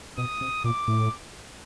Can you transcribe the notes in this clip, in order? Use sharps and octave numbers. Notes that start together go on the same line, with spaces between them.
B2 D#6
C3
A#2 D6
A2